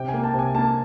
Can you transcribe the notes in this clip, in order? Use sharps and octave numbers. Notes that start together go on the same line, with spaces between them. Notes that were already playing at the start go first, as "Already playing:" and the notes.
Already playing: C3 G5
G#5
A#3
A5
C3
G#5
A#3 A5